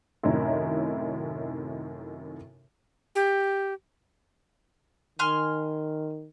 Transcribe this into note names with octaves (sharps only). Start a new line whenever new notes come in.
F#2 A2 C3 D#3 D#4 E4
G4
D#3 G#5 C6 F6